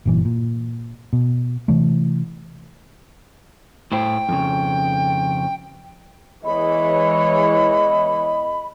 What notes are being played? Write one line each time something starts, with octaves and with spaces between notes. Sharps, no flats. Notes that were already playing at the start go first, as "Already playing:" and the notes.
F#1 G2 A#2 E3
A#2
B2
C3 E3 A3
A2 E4 C5 G5
F2 C#3
E2 E3 G#3 C#5 D#5 B5